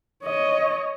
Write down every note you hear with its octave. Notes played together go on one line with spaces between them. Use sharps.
C#5 D#5